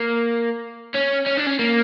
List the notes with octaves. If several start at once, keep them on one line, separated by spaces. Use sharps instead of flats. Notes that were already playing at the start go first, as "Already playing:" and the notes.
Already playing: A#3
C#4
C#4
D4
C#4
A#3